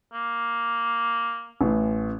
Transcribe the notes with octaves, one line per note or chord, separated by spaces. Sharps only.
A#3
A1 A2